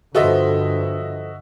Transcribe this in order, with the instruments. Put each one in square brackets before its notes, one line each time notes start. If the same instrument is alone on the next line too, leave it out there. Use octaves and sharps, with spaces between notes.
[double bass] G2 D3 [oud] F3 A4 B4 [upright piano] F#4 D#5 E5